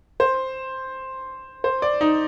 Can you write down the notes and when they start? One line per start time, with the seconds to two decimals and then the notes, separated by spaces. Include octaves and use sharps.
0.20 C5
1.64 C5
1.82 D5
2.01 D#4